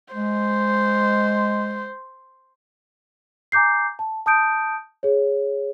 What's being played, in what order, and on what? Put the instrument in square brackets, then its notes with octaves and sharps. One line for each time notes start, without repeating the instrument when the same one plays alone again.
[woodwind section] G#3 [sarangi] C5
[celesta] G#5 A#5 D6 G6 C7
A5
A5 D#6 G6 D7
G#4 C#5